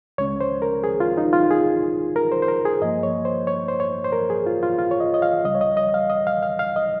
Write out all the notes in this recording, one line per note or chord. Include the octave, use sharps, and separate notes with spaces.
C#2 C#3 G#3 C#4 C#5
C5
A#4
G#4
F4
D#4
F4
G#4
A#4
C5
C5
A#4
G#4
G2 F3 A#3 D#5
C#5
C5
C#5
C5
C#5
C5
A#4
G#4
F4
F4
F4
C#5
D#5
D#5
F5
C#2 C#3 G3 D#5
C#5
D#5
D#5
F5
D#5
F5
F5
F5
D#5